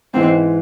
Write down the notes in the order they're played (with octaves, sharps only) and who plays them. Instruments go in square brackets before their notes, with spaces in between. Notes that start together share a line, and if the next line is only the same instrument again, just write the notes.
[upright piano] G#2 E3 G#3 [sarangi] C4